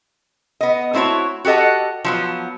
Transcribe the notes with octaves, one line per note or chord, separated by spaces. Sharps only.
B3 D#5
A3 C4 E4 F#4 C#5
F#4 G4 A4 D#5 F#5
F3 F#3 B3